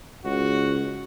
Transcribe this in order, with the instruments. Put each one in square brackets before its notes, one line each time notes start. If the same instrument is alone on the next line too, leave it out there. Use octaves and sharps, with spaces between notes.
[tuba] C#2 [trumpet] F#4